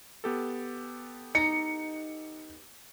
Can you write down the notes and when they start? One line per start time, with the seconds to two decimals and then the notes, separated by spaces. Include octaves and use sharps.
0.24 B3 G4 A4
1.35 D#4 C#7